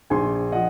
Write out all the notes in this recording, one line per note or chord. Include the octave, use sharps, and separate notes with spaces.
A#1 G#5 C6
F3 D#5 F#5